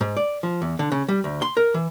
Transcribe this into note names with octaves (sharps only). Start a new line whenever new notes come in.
G#2
D5
F3
E2
D3
C#3
G3
D2
C6
A#4
E3